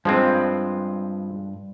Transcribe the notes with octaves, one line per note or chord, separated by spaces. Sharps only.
G2 F3 G#3 C4 B4